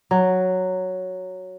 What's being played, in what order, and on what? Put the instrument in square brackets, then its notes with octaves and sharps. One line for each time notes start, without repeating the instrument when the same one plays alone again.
[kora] F#3